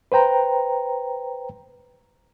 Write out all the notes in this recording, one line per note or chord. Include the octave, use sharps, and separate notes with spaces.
B4 C5 G5 A#5